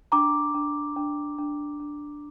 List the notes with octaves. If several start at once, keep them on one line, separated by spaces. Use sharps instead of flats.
D4 A#5 D6
D4
D4
D4
D4